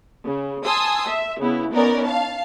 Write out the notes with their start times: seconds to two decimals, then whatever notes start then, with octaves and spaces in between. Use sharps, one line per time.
0.24 C#3
0.65 G#5 A5 C6 D#6 E6
1.08 E5
1.41 C#3 B3 E4
1.73 B3 C#4 D#4 A#4 D5
2.04 F5 A5